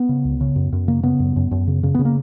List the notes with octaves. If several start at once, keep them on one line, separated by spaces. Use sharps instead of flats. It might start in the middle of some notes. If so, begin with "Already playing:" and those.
Already playing: B3
C#3
C#2
C#3
F#2
F#2
C#3 A#3
C#3 B3
F#2
F#2
F#2
C#3
C#3
C#3 B3
A#3